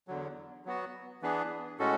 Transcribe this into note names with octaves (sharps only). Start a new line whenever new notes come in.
E2 D3 F#3
F#3 B3 F#4
E3 B3 D4 G#4 B4
A2 G#3 C#4 F#4 A4